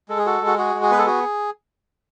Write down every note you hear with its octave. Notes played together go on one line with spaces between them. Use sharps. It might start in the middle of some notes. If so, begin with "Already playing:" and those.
G#3 A4
G#4
F#4 A4
G#3
F#4
F#4 G#4
G#3
G#4
B3 B4
A4
F#4 G#4